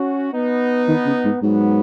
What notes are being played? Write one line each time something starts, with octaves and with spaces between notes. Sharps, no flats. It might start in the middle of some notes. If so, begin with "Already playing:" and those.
Already playing: C#4 F#4
B3 D#4
D#3
C#3
G#2
G#2 F#3 B3